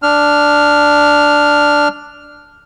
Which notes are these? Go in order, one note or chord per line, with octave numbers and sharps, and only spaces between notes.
D4 F6